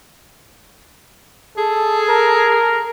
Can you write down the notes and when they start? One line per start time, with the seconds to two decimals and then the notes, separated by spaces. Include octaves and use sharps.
1.57 G#4 A4
2.09 A#4